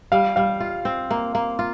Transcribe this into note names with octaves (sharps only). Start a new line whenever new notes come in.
G3 F5
G3 F5
F4
C4
A#3
A#3
F4